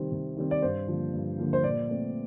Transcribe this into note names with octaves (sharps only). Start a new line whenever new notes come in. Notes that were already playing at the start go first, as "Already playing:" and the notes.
Already playing: C3 D#3 G3 C4
C3
D#3 G3 C4
D5
G2 C5
D3 F3 A#3
G2
D3 F3 A#3
C5
A#2 D5
A3 C4